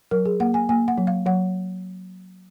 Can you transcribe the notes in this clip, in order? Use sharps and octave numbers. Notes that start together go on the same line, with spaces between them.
F#3 A#4
G#4
A#3 F#5
G#5
A#3 G#5
F#5
F#3
F5
F#3 F#5